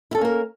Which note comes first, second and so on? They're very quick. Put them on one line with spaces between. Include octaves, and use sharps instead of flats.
E4 A4 C#4 A#3 A#4